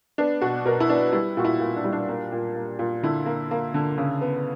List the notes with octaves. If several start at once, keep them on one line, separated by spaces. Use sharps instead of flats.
B3 D4
B2 F#4
B2 A#4
E4
B3 D4
G3 E4
A#2 F#4
E4
A#2
D4
G3 E4
D4
A#3
A#2
A#3
A#2
D3 E4
A#3
A#3
D3
C#3
B3